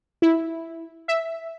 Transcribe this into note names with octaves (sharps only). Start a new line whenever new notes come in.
E4
E5